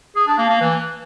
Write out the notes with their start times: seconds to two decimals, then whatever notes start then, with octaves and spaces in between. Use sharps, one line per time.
0.16 G#4
0.27 D4
0.38 A#3
0.50 A#3
0.61 E3